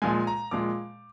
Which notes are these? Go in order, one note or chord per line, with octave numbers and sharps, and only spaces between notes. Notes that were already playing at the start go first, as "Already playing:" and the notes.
A#2 F3 G#3 G#5
A#5
A#2 F3 G#3 D6